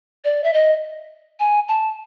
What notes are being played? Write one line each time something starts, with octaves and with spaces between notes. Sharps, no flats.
D5
E5
D#5
G#5
A5